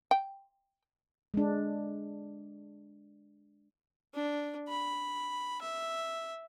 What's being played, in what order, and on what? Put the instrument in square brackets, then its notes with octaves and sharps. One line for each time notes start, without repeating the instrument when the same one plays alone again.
[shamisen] G5
[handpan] G#3 D4
[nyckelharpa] D4
B5
E5